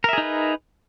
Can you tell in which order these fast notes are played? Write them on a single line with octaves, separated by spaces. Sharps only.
A#4 E5 G#4 D#4 B4